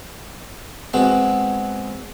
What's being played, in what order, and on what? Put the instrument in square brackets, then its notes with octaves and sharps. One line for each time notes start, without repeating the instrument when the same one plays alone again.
[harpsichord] G#3 B3 C4 F#4